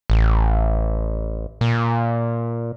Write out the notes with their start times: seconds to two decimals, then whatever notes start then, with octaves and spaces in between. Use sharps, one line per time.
0.10 A1
1.61 A#2